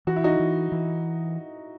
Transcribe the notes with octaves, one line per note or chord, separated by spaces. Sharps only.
E3 F#4
E4
D#4 F#4
E3
E3